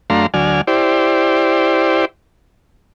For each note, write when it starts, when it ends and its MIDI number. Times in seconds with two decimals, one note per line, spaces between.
0.10 0.26 42
0.10 0.26 57
0.10 0.26 62
0.10 0.26 77
0.10 0.26 82
0.10 0.26 84
0.34 0.61 38
0.34 0.61 54
0.34 0.61 74
0.34 0.61 80
0.34 0.61 89
0.67 2.05 64
0.67 2.05 67
0.67 2.05 72
0.67 2.05 74